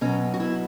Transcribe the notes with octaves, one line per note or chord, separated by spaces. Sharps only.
B2 F#3 C#4
F#4
E4